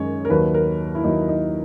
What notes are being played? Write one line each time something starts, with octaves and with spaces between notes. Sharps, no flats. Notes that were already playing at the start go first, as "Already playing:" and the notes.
Already playing: F#2 D#3 G#3 C#5
A#4
D#2 D#3 F#3 B4
A#4
E4
D#2 D#3 F#3 D#4
D#4